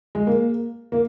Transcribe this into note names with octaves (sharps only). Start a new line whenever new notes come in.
G#3
A#3
A#3